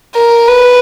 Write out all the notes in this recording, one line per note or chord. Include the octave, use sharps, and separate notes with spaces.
A#4
B4